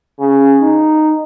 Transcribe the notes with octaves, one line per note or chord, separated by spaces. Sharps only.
C#3
D#4